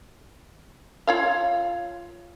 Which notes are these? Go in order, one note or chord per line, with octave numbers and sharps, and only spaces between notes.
F4 C#5 F5